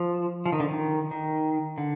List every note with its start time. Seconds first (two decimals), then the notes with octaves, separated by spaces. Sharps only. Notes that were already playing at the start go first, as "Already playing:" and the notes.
Already playing: F3
0.46 F3
0.52 D#3
0.60 D3
0.68 D#3
1.11 D#3
1.78 D3